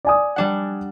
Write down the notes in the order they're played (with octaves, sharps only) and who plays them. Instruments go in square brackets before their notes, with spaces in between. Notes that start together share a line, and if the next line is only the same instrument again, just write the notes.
[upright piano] D5 G#5 D#6
[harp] G3 D4 F#5